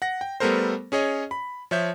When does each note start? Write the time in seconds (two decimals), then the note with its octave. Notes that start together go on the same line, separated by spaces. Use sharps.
0.02 F#5 A#6
0.21 G5
0.40 G3 A3 B3 A4 A#4 C5
0.92 C#4 G#4 C#5 D#5
1.31 B5
1.71 F3 C#5 E5 G6